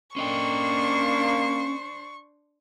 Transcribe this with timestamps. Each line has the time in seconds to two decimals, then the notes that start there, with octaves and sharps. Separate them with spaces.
0.16 A#3 C#4 D4 C5 D#5 G5 C#6